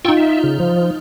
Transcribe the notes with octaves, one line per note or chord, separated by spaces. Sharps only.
D#4 F4 G5 C#6 E6
E5
C#3
F3